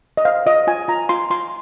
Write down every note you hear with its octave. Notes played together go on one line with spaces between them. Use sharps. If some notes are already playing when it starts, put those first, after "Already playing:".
D#5
C5 F5
F4 D#5
F4 G#5
F4 A#5
F4 C6
F4 C6